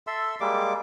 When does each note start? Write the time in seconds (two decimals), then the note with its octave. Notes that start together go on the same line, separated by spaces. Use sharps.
0.07 A4 E5 C6 E6
0.40 G3 G#3 A#3 D6